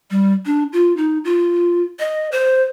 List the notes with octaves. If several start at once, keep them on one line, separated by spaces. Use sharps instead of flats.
G3
D4
F4
D#4
F4
D#5
C5